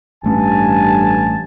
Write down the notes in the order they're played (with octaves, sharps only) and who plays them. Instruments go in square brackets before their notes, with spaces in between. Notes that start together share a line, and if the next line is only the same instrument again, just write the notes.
[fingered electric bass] A1 A3 C#4 [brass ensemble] G2 G#5 A5